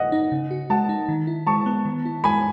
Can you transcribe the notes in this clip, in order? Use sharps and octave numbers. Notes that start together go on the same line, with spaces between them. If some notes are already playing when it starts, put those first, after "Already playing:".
Already playing: D#5 F#5
D#4
C#3
F#4
G#3 F#5 A5
D#4
D#3
E4
G#3 A5 C#6
B3
D#3
E4
G#3 G#5 B5